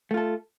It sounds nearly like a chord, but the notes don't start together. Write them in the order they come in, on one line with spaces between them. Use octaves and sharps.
A3 F4 A4